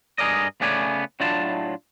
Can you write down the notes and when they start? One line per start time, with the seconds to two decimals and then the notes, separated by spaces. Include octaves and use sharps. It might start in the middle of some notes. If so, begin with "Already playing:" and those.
0.18 G2 G#4 A#4 D5 D#5
0.61 C#3 A3 B3 C#4 D5 G#5
1.20 A2 F#3 D4 E4 F4 A5